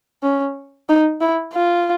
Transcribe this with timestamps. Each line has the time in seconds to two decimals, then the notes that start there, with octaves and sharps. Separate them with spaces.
0.23 C#4
0.89 D#4
1.21 E4
1.53 F4